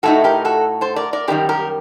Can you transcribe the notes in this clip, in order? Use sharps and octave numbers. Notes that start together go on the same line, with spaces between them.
A2 A3 D#4 F#4 A4
G4 A#4
F#4 A4
A4 C5
A#4 D5
A#4 D5
F#2 D#3 G3 G4 A#4
G4 A#4